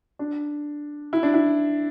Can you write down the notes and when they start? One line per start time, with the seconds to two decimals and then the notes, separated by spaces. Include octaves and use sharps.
0.19 D4
1.13 E4
1.23 D4
1.34 E4